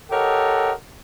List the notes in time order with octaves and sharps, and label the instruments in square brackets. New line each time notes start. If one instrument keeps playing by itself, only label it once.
[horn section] G4 A4 A#4 C#5 D#5 F#5